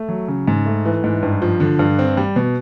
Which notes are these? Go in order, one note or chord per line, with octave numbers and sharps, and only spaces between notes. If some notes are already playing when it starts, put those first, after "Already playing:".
Already playing: A3
F#3
C#3
G#2
A3
E3
G#2
G2
F3
D3
G2
C4
G3
B2